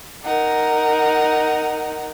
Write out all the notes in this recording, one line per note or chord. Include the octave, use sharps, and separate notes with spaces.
D#4 A#4 F#5